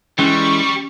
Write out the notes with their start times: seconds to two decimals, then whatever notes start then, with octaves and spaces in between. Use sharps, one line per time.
0.19 E3 G3 G#3 C#4 C#6